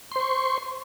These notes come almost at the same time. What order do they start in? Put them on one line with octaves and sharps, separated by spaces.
C6 C5 C#6